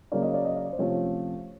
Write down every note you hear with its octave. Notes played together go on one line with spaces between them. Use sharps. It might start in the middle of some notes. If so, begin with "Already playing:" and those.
C#3 F#3 A#3 C#4 D5
D#5
D5
D#5
D5
C5
C3 F3 A3 C#4 C#5